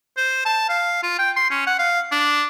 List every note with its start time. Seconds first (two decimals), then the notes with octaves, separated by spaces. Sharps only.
0.17 C5
0.45 A5
0.69 F5
1.03 F4
1.19 G5
1.37 C6
1.51 C#4
1.67 F#5
1.79 F5
2.12 D4